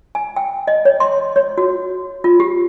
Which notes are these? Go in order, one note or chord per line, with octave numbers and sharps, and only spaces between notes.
G#5
G5
D#5
C#5
C6
C#5
F#4
F4
G4